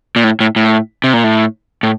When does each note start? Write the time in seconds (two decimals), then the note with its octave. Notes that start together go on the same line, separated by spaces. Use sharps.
0.16 A#2
0.24 A2
0.40 A2
0.56 A2
1.04 C3
1.13 A#2
1.24 A2
1.83 A2